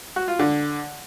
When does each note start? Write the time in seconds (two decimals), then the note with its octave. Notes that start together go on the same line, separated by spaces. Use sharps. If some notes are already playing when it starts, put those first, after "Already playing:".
0.16 F#4
0.28 F4
0.39 D3